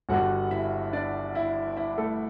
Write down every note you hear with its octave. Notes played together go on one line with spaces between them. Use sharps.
G1 G2 D3 G3 F#4 F#5
E4 E5
D4 D5
E4 E5
E4 E5
A3 A4